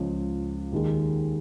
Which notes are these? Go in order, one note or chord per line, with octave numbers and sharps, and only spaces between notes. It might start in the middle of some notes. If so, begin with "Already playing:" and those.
Already playing: C#2 C#3 F3
D#2 D#3 G#3